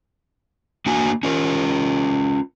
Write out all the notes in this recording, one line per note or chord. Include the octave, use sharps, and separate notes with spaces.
A#3 D4 F#4 G#5
C#4 F4 A#4